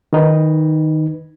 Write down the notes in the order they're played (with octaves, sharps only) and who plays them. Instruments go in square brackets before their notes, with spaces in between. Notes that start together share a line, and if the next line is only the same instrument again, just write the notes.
[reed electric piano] D#3 D#4 B4